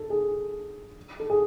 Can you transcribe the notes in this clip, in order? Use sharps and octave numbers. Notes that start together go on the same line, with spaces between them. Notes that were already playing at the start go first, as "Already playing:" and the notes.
Already playing: A4
G#4
A4
G#4